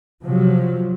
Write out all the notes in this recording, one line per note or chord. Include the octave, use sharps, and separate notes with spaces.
C3 F3 F#3